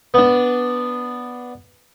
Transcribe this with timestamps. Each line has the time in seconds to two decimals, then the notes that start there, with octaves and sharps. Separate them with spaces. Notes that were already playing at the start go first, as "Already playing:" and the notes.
0.14 B3 D4